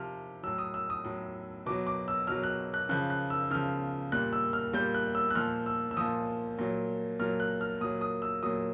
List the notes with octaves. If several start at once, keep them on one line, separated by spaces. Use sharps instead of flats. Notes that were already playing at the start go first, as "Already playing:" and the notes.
Already playing: C3 F3 F6
A2 F#3 E6
D#6
E6
D#6
A2 F#3
B2 F#3 D6
D6
E6
B2 F#3 F6
F#6
F#6
C#3 F3 F#6
F#6
E6
C#3 F3 F6
A#2 G3 F#6
E6
F6
A#2 G3 G6
F#6
E6
F#6
A#2 F3 F6
E6
E6
A#2 F3 D#6
A#2 F#3
A#2 F#3 F6
F#6
F6
A#2 F#3 D#6
D#6
E6
A#2 F#3 D#6